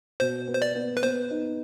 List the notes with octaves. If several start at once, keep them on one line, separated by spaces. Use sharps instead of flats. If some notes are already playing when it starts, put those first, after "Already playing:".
B2 C5
B3
C5
D5
B3
B4
B3 C5
D#4